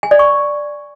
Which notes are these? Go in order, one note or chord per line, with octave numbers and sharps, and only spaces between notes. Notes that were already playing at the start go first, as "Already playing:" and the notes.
G#5
D5
C#6